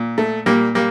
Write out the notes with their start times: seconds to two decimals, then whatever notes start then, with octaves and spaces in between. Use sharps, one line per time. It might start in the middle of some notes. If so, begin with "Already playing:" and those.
Already playing: A#2
0.18 A3
0.46 A#2 G3 A#3
0.75 G3 A#3